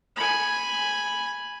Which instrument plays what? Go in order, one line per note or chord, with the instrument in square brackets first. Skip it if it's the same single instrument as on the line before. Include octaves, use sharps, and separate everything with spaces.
[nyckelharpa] G#5 B5